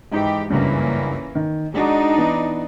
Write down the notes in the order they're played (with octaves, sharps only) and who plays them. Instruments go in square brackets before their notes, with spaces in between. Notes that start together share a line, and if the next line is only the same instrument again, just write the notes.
[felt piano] G#2 D#4 [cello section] E3 G4
[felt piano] F#1 C#2 G2 [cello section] E3 A#3 C#4
[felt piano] D#3
[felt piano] G#3 F#4 [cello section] D4 D#4 D5
[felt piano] E3 B3